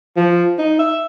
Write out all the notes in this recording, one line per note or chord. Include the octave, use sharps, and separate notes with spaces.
F3
D#4
E5